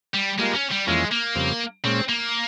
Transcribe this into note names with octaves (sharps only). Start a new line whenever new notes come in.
G3
G3 G#3 A#3 F4 A#4
C#4
G3
F2 E3 G#3 A#3 C#4 F4
A#3
F2 C#3 G3 C4
A#2 G#3 C4 C#4
A#3